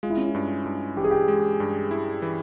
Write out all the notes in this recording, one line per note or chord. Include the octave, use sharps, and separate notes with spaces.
G#3 F4
E4
C#4
E4
G2
G2
E3 G4
G#4
G4
G#3
G2
E4
E3